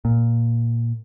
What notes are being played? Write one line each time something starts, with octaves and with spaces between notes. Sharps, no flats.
A#2